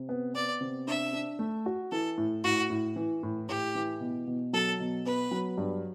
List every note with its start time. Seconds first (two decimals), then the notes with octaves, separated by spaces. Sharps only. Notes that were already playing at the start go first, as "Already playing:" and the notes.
Already playing: C3
0.09 B3
0.34 B3 D5
0.61 C3
0.87 D4 E5
1.13 D4
1.39 A3
1.66 F#4
1.92 E3 A4
2.18 A2
2.43 A2 F#4
2.70 A2
2.96 E3
3.23 A2
3.48 A2 G4
3.75 E3
4.00 B2
4.27 B2
4.53 F#3 A4
4.80 B2
5.05 B3 B4
5.31 F#3
5.58 G2